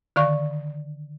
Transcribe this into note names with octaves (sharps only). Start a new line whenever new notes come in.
D3 D#3 D5 F5 C#6